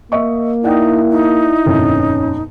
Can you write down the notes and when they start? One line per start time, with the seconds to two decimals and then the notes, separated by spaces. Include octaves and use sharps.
0.12 A#3 D#5 E5 C#6
0.64 D#4 E4 D5 F#5 G5
1.10 D#4
1.66 G1 F2 A#2 C#4